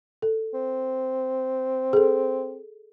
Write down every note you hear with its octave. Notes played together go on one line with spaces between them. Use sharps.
A4
C4
G#4 A4